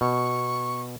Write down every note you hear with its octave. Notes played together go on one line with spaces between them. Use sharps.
B2 C#6